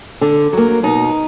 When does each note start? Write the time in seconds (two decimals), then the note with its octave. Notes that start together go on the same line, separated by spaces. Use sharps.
0.21 D3
0.53 F#3 A#3
0.83 B2 D#4